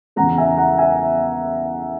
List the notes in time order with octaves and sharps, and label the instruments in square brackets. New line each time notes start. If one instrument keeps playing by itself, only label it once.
[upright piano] E2 C#3 E3 G#3 F#5 A#5
E5 G#5
F#5 A#5
E5 G#5